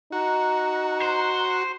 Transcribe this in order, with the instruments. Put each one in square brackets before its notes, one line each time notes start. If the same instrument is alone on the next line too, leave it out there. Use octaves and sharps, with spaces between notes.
[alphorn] D#4 [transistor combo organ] F#4 [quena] A#5
[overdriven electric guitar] C5